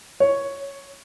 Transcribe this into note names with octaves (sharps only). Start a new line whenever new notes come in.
C#5